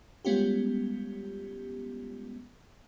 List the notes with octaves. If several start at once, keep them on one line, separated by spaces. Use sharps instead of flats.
G3 G#3 B3 C#4 F4 G4